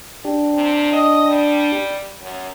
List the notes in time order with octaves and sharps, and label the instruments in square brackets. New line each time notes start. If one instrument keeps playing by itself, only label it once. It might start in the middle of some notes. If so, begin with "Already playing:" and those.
[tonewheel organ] D4 G4
[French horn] C3
D#5
G3
F#2